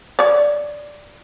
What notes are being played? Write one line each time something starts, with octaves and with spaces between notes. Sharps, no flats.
C#5 D5